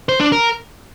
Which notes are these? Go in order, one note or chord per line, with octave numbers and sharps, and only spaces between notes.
C5
D4
A#4